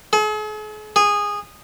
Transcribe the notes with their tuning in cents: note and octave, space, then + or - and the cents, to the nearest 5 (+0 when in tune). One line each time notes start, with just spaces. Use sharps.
G#4 +45
G#4 -15